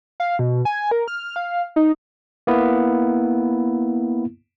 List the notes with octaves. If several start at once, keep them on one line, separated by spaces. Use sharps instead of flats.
F5
B2
G#5
A#4
F6
F5
D#4
A#3 B3 E4